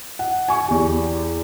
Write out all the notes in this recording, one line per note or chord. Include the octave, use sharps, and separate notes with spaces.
F#5
G#5 C#6
E2 G4